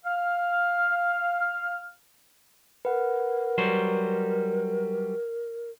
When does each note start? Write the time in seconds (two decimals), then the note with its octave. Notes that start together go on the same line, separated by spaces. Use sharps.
0.05 F5 F6
2.85 A#4 B4 F#5
3.58 F#3 G3 C5